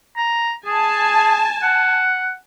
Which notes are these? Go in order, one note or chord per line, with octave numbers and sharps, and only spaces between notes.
A#5
G#4 G#5 A5
F#5